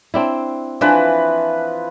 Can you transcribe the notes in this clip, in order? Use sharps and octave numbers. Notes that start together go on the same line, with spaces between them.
C4 D4 E4
E3 F3 D4 B4